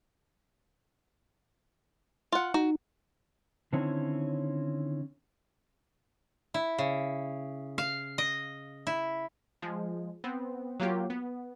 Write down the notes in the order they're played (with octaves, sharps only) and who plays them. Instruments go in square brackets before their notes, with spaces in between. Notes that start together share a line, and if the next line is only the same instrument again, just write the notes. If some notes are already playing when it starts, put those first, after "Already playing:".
[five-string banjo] F4 F#5
[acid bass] D#4 [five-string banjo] F#4
[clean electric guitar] D3 D#3 C4 C#4 E4 C#5
[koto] E4
C#3
F5
D#5
E4
[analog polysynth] F3 G#3
B3 C4
F#3 A#3 F4 G4
B3